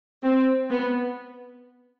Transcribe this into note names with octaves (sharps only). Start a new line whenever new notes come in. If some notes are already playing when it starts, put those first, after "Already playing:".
C4
B3